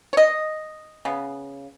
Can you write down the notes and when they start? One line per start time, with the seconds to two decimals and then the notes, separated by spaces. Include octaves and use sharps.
0.13 C#5
0.17 D#5
1.05 C#3 B3